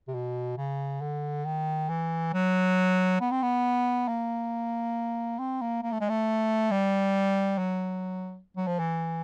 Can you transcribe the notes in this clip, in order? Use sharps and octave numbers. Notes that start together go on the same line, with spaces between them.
C3
B2
C#3
D3
D#3
E3
F#3
B3
C4
B3
A#3
C4
A#3
A#3
A3
G#3
A3
G3
F#3
F#3
F3
E3